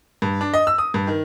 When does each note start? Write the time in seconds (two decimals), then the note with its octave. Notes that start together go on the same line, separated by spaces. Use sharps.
0.22 G2
0.41 D4
0.54 D#5
0.67 E6
0.78 D#6
0.94 G2
1.07 D#3